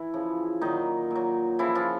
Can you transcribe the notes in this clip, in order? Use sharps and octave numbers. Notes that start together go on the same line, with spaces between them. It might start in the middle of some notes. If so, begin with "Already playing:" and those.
Already playing: E3 E4
C#3 F3
A#2 D#3 F#3 D#4
A#2 F#3
C#3 E3 F3 E4
F3 F4